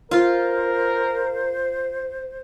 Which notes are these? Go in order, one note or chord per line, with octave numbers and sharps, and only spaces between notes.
F4 A#4 C5